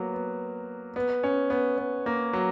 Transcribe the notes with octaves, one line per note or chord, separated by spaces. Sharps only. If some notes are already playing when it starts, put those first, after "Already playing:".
Already playing: F#3 A#3 B3
B3
B3
C#4
B3
B3
A#3
F#3